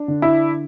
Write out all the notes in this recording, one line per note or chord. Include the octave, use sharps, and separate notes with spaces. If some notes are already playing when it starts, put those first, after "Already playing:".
Already playing: D4
D3
E4